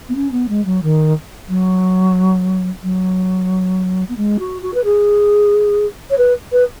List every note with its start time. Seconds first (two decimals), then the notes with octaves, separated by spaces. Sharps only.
0.08 B3
0.15 C#4
0.31 B3
0.48 G#3
0.65 F#3
0.82 D#3
1.48 F#3
2.83 F#3
4.09 B3
4.17 G#3
4.39 F#4
4.62 F#4
4.74 B4
4.84 G#4
6.10 C#5
6.18 B4
6.52 B4